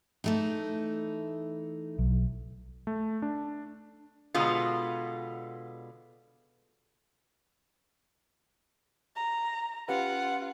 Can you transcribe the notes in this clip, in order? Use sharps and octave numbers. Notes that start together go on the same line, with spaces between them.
E3 A3 D#4
B1 F#3
A3
D4
B2 D3 G#3 B3 F4
A#5
C#4 F4 G4 B4 F#5